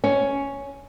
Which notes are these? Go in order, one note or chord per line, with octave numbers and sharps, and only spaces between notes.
C#4